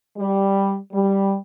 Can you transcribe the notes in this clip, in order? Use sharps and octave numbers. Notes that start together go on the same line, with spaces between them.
G3
G3